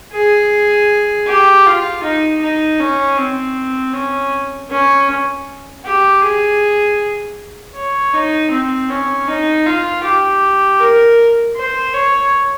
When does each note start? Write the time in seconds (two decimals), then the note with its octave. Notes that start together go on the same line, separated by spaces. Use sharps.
0.12 G#4
1.27 G4
1.66 F4
2.03 D#4
2.41 D#4
2.80 C#4
3.17 C4
3.93 C#4
4.70 C#4
5.85 G4
6.22 G#4
7.75 C#5
8.13 D#4
8.51 C4
8.89 C#4
9.28 D#4
9.66 F4
10.03 G4
10.80 A#4
11.56 C5
11.94 C#5